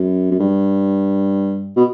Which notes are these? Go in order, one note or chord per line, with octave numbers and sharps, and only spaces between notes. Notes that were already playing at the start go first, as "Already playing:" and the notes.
Already playing: F#2
F#2
G2
B2